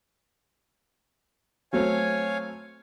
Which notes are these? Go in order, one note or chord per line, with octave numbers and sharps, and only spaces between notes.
F#3 A3 C4 C#5 F5 G#5